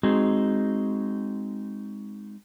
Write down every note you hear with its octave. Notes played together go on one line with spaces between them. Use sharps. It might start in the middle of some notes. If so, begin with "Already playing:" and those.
G#3 C4 D#4 F#4 G#4